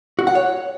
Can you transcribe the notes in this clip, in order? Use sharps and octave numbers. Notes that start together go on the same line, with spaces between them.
F#4
F#5
C#5